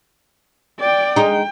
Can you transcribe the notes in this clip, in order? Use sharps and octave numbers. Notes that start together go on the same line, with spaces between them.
D5 G5
G#3 D#4 G5